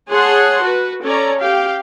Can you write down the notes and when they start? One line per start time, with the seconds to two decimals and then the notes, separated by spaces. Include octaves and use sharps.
0.11 G#4 C#5 F#5 A5 C6
0.62 F#4 B4
1.03 C#4 A4 C#5 D5 A#5
1.40 G4 F5 G5